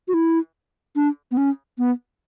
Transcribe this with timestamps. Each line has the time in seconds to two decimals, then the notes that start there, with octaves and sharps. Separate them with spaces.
0.08 F#4
0.14 E4
0.96 D4
1.31 B3
1.37 C#4
1.78 B3